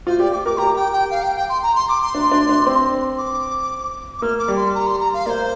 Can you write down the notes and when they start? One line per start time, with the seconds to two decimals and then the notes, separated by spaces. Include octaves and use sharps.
0.07 F4 C5
0.19 G4 D5
0.32 G4 D6
0.46 A#4 D6
0.58 G4 A#5
0.76 G5
0.93 G5
1.11 F5
1.23 G5
1.36 G5
1.49 C6
1.63 A#5
1.76 C6
1.89 D6
2.02 C6
2.14 D4
2.32 D4
2.49 D4
2.66 C4
3.18 D6
4.18 D6
4.22 A#3 F6
4.39 D6
4.48 G3
4.56 C6
4.75 A#5
4.87 C6
5.00 A#5
5.14 F5
5.26 A#3 C5 D5